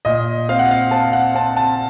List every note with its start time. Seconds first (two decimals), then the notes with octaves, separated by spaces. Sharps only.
0.05 A#2 D#5
0.49 C4 F5
0.59 F#5
0.71 F5
0.91 C4 A5
1.13 F#5
1.35 C4 A5
1.57 A5